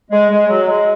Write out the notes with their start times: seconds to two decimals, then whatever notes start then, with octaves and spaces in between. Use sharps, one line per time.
0.11 G#3
0.30 G#3
0.48 F#3
0.68 G#3